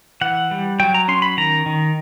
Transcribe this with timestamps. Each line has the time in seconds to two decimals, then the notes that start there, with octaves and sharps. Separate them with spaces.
0.21 E3 F#5
0.51 G3
0.80 F#3 G5
0.94 A#5
1.08 C#4 C6
1.22 B5
1.37 D#3 A#5
1.66 D#3